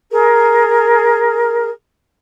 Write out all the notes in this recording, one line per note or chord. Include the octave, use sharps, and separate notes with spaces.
G#4 A#4